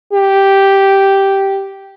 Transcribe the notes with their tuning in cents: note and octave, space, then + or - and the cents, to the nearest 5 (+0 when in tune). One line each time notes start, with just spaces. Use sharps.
G4 -5